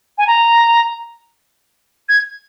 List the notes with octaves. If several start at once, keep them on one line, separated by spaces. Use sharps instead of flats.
G#5
A#5
G#6